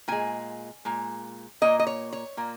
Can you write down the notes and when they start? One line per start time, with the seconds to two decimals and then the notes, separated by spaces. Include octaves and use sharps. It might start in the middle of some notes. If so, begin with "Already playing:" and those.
0.08 A#2 G#3 G#5
0.85 A#2 G#3
1.62 A#2 A#3 D#5
1.79 D#5
1.87 C#5
2.13 C#5
2.37 A#2 A#3